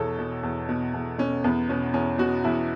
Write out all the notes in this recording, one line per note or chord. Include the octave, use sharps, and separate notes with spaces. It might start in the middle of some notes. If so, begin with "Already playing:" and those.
Already playing: E2 B2 A4 C#5
B2
E2
B2
E2
B2 C#4
E2 B3
B2 C#4
E2 C#4
B2 F#4
E2 E4